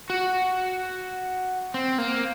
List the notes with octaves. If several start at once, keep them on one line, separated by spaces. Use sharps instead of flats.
F#4
C4
A#3